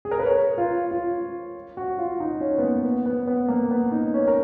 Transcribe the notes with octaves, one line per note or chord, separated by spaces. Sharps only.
G#4
A#4
B4
C#5
F4
F4
F#4
F4
D#4
C#4
B3
A#3
B3
B3
B3
A#3
B3
D#4
C#4
A#4